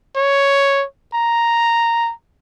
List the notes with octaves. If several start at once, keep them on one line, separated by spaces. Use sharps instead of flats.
C#5
A#5